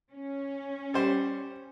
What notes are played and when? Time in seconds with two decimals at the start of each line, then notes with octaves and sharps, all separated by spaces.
0.11 C#4
0.94 G3 C5